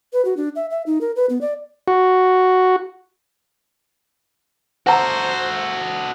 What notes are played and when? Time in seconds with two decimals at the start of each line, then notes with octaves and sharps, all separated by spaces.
0.13 B4
0.25 F#4
0.37 D4
0.56 E5
0.71 E5
0.86 D#4
1.01 A#4
1.16 B4
1.30 B3
1.41 D5
1.88 F#4
4.87 F#4 A4 C5 F#5 A#5